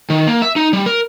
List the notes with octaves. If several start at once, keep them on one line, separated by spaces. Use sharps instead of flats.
D#3
A#3
E5
D#4
G3
A#4